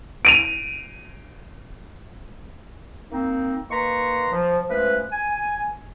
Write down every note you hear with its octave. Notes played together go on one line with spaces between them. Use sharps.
D7 D#7 F7
A#3 C4 D#4
D#3 A#3 B4 A#5 C6 C#6
F3
F3 G#3 A3 C#4 B4
G#5